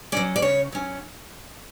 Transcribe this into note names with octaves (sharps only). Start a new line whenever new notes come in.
F#3 C#4 D5
D5
C#3 C#5
F#3 C#4